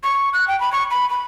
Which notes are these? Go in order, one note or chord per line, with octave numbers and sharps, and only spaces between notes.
C#6
F#6
G5
B5
C#6
B5
B5